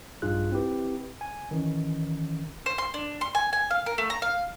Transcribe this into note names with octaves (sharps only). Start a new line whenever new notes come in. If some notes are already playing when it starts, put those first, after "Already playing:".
A#1 G2 D#4 F4 G#4 F#6
C4 E4 G4 B4
G#5
D#3 E3 C#4
C5
C6
D4
C6
G#5
G#5
F5
A#4
A3
A#5
F5